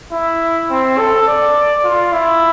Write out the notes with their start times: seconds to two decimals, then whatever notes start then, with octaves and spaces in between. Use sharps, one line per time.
0.12 E4
0.70 C4
0.98 A4
1.27 D5
1.84 F4
2.12 E4